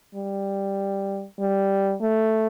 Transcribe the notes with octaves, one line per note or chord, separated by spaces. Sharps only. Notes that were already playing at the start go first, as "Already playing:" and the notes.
G3
G3
A3